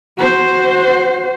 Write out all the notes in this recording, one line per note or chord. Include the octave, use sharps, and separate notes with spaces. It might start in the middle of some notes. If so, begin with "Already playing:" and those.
F#4 C5